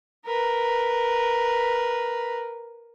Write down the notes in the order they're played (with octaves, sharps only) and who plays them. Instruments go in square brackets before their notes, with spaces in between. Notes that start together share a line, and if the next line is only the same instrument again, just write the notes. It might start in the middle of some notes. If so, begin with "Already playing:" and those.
[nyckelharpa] A#4 B4